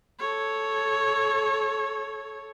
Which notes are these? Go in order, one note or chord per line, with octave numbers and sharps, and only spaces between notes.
A4 C#5